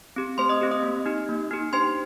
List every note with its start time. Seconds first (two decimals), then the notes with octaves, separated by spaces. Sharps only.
0.16 C4 G4
0.38 A3 C5 C6
0.49 D#5 D#6
0.61 C4 G4
0.71 D#5 D#6
0.83 A#3
1.06 D#4 G4
1.29 A#3
1.51 D#4 G4
1.73 D4 C5 C6